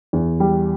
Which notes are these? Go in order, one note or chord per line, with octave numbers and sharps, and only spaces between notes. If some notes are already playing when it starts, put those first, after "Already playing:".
E2
G3